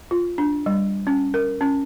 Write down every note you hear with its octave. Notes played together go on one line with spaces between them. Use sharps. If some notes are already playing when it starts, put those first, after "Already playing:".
F4
D4
G3
C#4
A#4
C#4